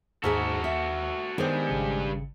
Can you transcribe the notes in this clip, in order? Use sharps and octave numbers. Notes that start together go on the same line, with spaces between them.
D#2 G#2 F#4 G#4 A4 F#5 F6 B6
E5
G2 D#3 G3 G#3 B3 C5
G#1 C#3 C#7